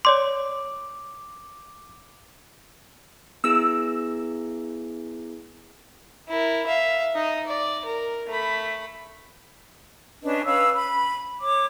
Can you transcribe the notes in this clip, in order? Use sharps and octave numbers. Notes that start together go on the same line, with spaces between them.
C#5 D5 C6 D6
B3 E4 G#4 E6
E4 A#4
E5 F5
D#4 D#5
D5
A#4
A3 B5
C#4 D4 B4 D#5
C#4 B4 F5 E6
B5
C#5 D6